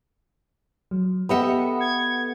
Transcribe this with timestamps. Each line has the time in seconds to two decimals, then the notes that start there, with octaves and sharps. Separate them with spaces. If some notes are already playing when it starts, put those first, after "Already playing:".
0.91 F#3
1.29 B3 G4 A4 D#5 E5 F#5 C#7
1.80 G#6